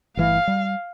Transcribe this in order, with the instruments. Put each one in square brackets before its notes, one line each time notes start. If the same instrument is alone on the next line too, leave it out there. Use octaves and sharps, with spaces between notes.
[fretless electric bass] G1 E3 A3 [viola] F5
[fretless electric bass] G3